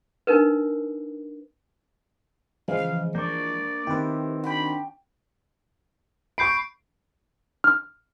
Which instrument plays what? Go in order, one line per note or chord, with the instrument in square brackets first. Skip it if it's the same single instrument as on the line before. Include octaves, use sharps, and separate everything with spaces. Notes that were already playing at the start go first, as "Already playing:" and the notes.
[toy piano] D4 D#4 A#4 B4
[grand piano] C#3 [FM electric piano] E3 F3 G#3 [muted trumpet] F5
[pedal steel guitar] A#3 D4 C#6 [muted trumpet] D5 [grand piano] G6
[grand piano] D#3 C4 [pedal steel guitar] E4 [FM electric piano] G4 B4
[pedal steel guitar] D4 [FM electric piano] F#4 G5 [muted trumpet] B5
[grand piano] B5 C#6 [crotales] G6 C7 D7
[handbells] F6